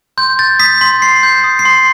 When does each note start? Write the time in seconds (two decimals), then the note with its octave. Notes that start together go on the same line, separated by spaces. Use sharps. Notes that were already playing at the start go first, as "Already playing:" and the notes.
0.17 C6 G6
0.39 G6 A6
0.59 D#6 B6
0.81 C6 B6
1.02 C6 C7
1.23 G6
1.44 D#6
1.59 C7
1.65 C6